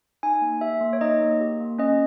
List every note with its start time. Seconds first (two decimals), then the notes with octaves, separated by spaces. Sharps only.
0.23 D#4 G#5
0.42 A#3
0.61 G4 E5
0.81 A#3
0.93 C#5
1.01 D#4 D#5
1.21 A#3
1.41 G4
1.60 A#3
1.79 C#4 D#5